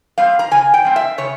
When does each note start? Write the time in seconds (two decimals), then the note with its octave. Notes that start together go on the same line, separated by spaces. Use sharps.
0.18 G3 C4 F5
0.39 A#5
0.51 C#3 G#5
0.74 G5
0.85 G3 C4
0.96 E5
1.18 C#3 C#5